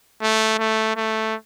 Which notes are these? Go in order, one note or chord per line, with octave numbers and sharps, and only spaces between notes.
A3
A3
A3